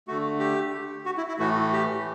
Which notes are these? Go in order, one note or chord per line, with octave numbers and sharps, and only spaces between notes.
D3 A3 F#4
G4
F#4
E4
E4
A2 E3 A3 F#4
G4